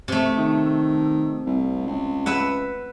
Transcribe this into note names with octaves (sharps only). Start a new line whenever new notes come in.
C3 A3
D#3
C2
C#2
B4 E5 F#5